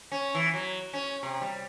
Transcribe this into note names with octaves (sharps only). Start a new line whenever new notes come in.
C#4
E3
F#3
C#4
C3
G3